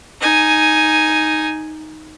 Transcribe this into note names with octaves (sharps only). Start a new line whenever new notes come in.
D#4 G#5